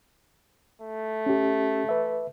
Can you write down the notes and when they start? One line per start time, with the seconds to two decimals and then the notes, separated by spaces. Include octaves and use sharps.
0.81 A3
1.26 C#4 G4
1.89 B4 E5